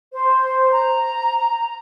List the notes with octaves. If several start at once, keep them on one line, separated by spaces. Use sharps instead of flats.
C5
A#5